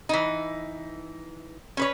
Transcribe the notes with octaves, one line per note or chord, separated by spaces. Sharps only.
E3 D#4
C#4 B4 C#5